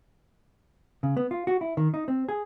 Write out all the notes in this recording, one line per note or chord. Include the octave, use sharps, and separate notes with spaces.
C#3
B3
F4
F#4
E4
D#3
D#4
C4
G#4